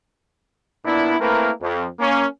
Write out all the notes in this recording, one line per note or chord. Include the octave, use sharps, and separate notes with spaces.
A#2 B3 D4 E4
A3 A#3 C4 E4 A#4 B4
F2
A#3 C#4